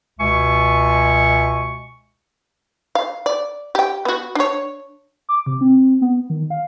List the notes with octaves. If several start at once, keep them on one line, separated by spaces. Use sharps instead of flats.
C#2 B2 G#3 E5 G#5 C#6
F5
D5
G4 G5
B3 F#4
D4 C#5
D6
C3
C4
B3
D#3
F5